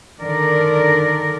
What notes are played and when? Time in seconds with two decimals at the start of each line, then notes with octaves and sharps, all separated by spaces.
0.21 D3 D#3 A#4 D5